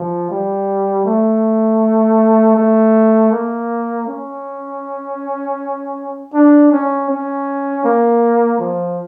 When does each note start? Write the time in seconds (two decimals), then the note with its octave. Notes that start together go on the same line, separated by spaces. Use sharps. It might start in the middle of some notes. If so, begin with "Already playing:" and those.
Already playing: F3
0.31 G3
1.06 A3
2.56 A3
3.32 A#3
4.08 C#4
6.34 D4
6.72 C#4
7.09 C#4
7.84 A#3
8.59 F3